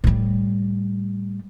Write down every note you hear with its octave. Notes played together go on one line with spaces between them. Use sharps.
A2 G3